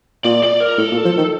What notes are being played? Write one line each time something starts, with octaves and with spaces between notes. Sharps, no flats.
A#2 D5
D5
A#4
A2 A4
A#2
F3
D#3